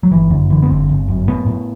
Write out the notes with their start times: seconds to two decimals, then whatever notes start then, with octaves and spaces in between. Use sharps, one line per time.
0.03 F#3
0.11 G1 E3
0.31 F#2 D3
0.50 D3 E3
0.62 B3
0.69 G1 C4
0.89 G1
1.08 F#2
1.28 A2 B3
1.46 A2